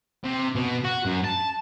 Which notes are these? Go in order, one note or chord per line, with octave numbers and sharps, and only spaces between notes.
C3
B2
F#4
F#2
A5